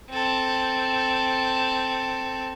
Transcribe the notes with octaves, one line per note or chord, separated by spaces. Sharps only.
C4 A4